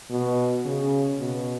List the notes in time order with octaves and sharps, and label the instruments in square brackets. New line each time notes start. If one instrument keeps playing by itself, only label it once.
[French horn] B2
C#3
B2